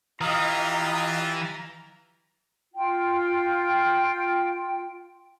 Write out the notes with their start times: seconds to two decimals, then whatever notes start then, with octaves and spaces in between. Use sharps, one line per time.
0.21 E3 F4 G4 D#5 F5 A#5
2.74 F4 G5